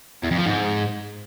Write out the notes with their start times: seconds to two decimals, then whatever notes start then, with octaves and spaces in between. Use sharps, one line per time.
0.23 E2
0.31 F2
0.38 F3
0.46 G#2